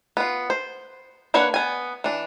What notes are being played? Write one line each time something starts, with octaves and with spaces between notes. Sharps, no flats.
B3 F4
C5
A#3 D4 B4 C#5 F#5
B3 G#5
E3 D4